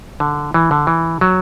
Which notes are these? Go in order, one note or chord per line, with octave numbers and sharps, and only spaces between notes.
D3
E3
D3
E3
F#3